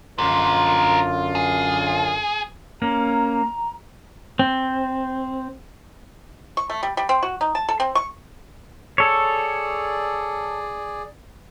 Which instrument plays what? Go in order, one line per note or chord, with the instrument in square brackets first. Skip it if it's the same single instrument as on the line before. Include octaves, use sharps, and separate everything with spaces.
[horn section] F#2 D3 F4 [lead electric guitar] A#4 C5
[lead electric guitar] G#4
[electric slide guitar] A#3 C#4 [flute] A#5
[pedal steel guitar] C4
[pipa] C#6
A3
G3
G3
C4
F#4
D#4
A5
A4
C4
C#6
[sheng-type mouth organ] G#4 D5 [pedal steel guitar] A4 C#5